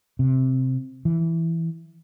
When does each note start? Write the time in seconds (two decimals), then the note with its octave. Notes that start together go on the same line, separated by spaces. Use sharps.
0.19 C3
1.05 E3